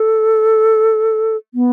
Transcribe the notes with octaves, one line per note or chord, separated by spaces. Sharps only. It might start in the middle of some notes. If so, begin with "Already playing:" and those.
Already playing: A4
B3